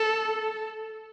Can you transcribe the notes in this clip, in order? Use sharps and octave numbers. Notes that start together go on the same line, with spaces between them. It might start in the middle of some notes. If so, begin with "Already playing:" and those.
Already playing: A4